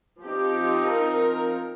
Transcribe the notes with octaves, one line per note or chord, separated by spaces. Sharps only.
F3 C4 D#4 G4
A#4